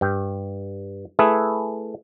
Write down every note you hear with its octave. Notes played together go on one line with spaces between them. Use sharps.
G2 G5
A3 E4 G#4 B4 E5